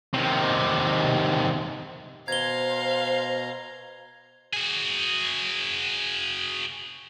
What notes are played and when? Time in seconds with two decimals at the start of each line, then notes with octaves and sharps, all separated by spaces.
0.14 C3 D#3
2.28 B2 C5 F5 A#5 G#6 G7
4.53 F#4 G#4